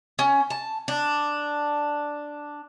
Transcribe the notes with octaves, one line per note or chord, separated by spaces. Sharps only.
C#4
A5
D4